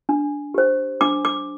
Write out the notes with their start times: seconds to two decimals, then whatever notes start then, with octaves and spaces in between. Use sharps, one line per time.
0.09 D4
0.54 G4 C5
1.01 D4 D6
1.25 D6